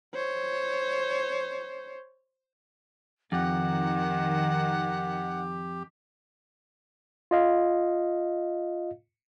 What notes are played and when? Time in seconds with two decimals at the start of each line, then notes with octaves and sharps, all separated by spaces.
0.14 C5 C#5
3.32 F2 D#3 G4 F#5
7.31 F4 D#5 F5